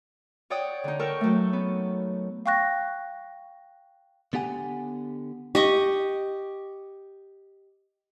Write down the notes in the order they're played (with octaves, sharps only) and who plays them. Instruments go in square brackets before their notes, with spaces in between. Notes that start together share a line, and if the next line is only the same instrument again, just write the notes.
[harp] C#5 D5 F#5 G5 D#6
D3 D#4
A4 A#4 G5 C#6
F#3 A3
B3
[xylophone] F5 G5 C#6 F#6 A#6
[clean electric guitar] D3 B3 G4 F#5 G#5
[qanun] G4 D#5 C#6